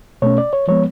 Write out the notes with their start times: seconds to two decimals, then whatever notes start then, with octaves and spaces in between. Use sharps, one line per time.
0.22 B2 A3 C#4 C#5
0.38 D5
0.53 C#5
0.68 F3 G#3 B3 C#5